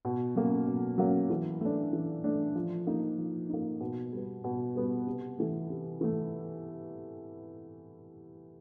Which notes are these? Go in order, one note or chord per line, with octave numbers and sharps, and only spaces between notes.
B2
F#3 A#3 C#4
B2
F#3 A#3 C#4
E3
A3 D4
E3
A3 D4
F3
A#3 D#4
F3
A#3 D#4
B2
G3 B3
B2
G3 B3
C3
E3 A3
C3
E3 A3